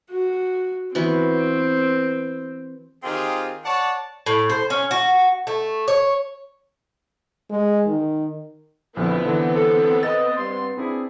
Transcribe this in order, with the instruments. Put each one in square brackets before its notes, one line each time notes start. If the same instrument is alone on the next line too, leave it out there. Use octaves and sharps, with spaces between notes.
[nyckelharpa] F#4
[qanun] E3 B3 F#4 [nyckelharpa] C4
[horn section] D#3 C4 F4 G4 G#4
C#5 D5 F#5 A5
[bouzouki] A2
C5
C#4
F#4
A3
C#5
[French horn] G#3
D#3
[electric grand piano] A#1 D3 F3 [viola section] B3 C4 [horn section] E4
[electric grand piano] D3 E3
[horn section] A4
[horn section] D#5 [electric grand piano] A6
[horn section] G2 C6
[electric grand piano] C4 D4 [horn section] E4 G#4